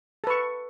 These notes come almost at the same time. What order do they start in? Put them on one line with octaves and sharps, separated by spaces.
A4 B4 C#6